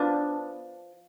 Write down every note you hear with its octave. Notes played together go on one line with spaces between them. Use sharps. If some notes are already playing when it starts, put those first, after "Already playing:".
Already playing: F3 B3 D4